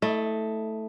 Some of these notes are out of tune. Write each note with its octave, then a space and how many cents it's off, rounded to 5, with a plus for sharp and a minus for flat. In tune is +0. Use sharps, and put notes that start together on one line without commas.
A3 +0 E4 -30 D#5 +0